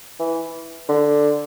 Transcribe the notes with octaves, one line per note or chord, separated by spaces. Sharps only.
E3
D3